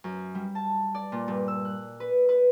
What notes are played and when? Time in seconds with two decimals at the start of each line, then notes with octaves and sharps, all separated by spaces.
0.04 F#2
0.35 G3
0.55 A5
0.95 D5
1.12 A#2
1.28 G2
1.48 E6
1.65 F#6
2.00 B4
2.29 B4